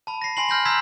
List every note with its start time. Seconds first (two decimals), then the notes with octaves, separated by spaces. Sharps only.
0.07 A5 B5
0.22 A#6 C7
0.37 G#5 B5 C6 A#6 C7 F#7
0.49 F6 G6 A#6 F#7
0.65 A#5 C6 E6 F6 G#6 B6